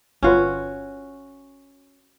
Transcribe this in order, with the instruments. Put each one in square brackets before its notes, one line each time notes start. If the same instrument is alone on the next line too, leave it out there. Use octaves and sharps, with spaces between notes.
[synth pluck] G1 F4 B4 [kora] C#4 F#4